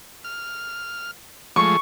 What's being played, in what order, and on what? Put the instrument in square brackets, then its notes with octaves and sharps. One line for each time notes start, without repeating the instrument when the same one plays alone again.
[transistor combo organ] F6
[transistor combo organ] F3 G#3 A3 [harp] C#6